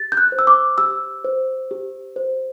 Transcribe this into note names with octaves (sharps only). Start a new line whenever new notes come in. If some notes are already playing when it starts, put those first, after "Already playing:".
Already playing: G4 A6
G6
F#6
C5
E6
D6
G4 E6
C5
G4
C5